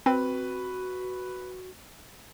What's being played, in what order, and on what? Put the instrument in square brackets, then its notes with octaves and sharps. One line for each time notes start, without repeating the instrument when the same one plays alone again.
[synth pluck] C4 [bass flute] F#4 [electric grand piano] B4